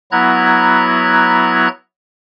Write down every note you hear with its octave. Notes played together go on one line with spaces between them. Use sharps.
F#3 B3 E4 A#5 F#6 G#6